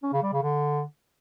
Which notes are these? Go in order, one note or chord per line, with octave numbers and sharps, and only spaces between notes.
C#4
C#3
G3
C#3
D3